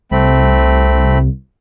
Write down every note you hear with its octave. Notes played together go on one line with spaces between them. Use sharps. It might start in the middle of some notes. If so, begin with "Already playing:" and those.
C2 A3 C4 B5